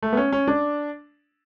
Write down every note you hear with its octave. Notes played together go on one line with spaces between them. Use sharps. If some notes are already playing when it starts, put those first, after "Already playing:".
A3
B3
C#4
C#4
D4